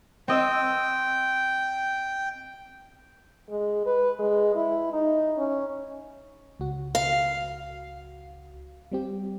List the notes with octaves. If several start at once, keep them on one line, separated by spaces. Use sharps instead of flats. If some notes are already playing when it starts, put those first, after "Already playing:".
C4 D#5 G5 E6
G#3
B4
G#3
E4
D#4
C#4
C#2 F#4
F5
G3 C4 G4